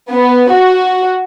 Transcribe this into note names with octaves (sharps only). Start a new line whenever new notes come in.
B3
F#4